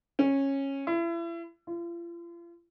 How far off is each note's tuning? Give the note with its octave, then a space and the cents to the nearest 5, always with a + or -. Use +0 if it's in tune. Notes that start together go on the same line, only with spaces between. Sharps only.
C#4 -15
E4 +35
F4 -40